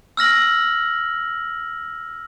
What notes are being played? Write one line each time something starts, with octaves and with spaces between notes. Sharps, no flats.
E6 F6 A#6 F#7